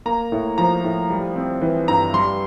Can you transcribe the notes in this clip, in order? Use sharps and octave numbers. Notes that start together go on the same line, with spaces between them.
A#3 A#5
A2
F3 A#5
A2
G3
C4
E3
G2 A#5
G3 C6